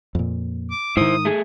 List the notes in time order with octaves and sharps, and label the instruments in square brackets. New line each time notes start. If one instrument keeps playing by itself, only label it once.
[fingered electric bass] F2 A#2
[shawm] D6
[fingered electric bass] G#2 D#3 [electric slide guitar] E4 C5 [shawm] D#6
[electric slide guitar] A3 G#4